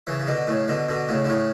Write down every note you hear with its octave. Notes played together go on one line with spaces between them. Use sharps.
C#3 E3
C#3
B2 D3
A2 C#3
B2 D3
B2 D3
A2 C#3
D3
A2 C#3